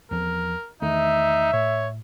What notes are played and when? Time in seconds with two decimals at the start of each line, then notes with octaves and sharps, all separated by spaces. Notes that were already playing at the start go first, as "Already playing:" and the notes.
0.11 E2 F3 A#4
0.82 E2 D#3 A3 D#4 E5
1.53 A2 C#5